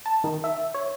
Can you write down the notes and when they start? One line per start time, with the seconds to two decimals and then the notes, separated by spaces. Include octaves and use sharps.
0.06 A5
0.24 D#3
0.44 E5
0.74 C#5